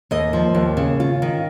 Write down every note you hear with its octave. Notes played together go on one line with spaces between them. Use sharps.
D#2 D#5
F3
D#2
C#3
F4
D#3